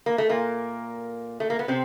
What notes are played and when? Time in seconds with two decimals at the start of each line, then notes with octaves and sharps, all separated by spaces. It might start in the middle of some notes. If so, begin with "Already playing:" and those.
0.06 A#3
0.18 A3
0.29 A#2 A#3
1.40 A3
1.50 A#3
1.59 B3
1.68 C3 C4